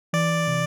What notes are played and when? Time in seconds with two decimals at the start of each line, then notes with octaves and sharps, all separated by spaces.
0.13 E3 D5
0.47 C3